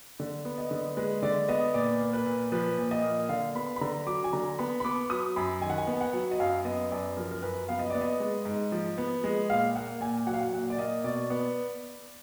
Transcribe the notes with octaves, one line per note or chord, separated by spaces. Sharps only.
D3
B3
D#5
D3
G#3 B4
D3 D5
B3 D#5
A#2 D5
A#3
B4
A#2
F3 B4
A#2
D#5
A#3
D3 F5
B3 B5
B5
D3 A#5
F#3 D6
G#5
D3 A#5
B3 B5
B5
B3 D6
F#3 D#6
F#2 B5
D#3 G#5
F#5
G#5
B3
F#5
F#3
D#5
F#2 F5
B3 D#5
F#2 D5
F3 A#4
A#4
F#2 B4
B3 F5
D#5
B3 D5
D#5
G#3
G#2
F3
B3
G#3
A#2 F5
A#3 F#5
A#2 G#5
F#3 F#5
F5
F#5
A#2 F#5
D5
A#3 D#5
B2 D5
B3